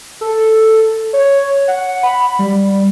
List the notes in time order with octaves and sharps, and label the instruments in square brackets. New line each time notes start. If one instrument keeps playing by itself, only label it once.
[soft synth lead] A4
C#5
F#5
B5
G3